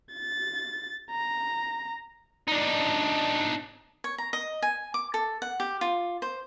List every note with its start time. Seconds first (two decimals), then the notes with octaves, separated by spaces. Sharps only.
0.14 A6
1.11 A#5
2.48 D4 D#4
4.04 C#5
4.18 A#5
4.33 D#5
4.62 G#5
4.94 D6
5.14 A4
5.42 F#5
5.60 G4
5.81 F4
6.22 C5